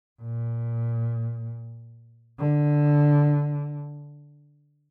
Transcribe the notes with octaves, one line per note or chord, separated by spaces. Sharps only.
A#2
D3